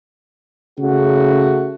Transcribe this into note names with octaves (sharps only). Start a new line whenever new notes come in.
C#3 A3 F#4